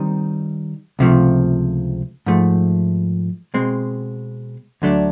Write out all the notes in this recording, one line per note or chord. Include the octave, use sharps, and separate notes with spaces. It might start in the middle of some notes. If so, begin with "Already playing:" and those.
Already playing: D#3 G3 C4 D#4
C#2 C3 F3 A3
G#2 F3 A3
B2 G#3 C4
D2 D3 F#3 A3 D4